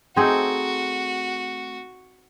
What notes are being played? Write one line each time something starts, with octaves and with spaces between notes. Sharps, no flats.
A3 C4 D#4 F#4 G#4